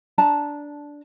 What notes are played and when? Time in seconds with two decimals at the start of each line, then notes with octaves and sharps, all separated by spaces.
0.18 D4 A5 A#5